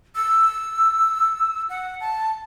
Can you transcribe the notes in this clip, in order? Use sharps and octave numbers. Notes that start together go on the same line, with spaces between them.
E6
F#5
A5